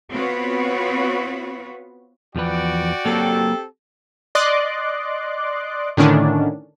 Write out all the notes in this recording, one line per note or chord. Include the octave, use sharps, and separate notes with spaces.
B3 C4 F4 F#4 B4 C#5
E2 F3 F#4 B4 D5 G5
F#3 A#3 C4 G4 A4
D5 D#5 C6 D6 F#6
A2 D3 D#3 C#4 D4